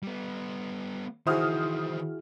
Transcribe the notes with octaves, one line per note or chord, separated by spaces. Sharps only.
G3 B3
D#3 E3 E4 F#4 G#4 C5 D#6 F6